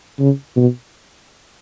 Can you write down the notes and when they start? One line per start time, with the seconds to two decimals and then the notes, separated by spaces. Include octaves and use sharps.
0.19 C#3
0.56 B2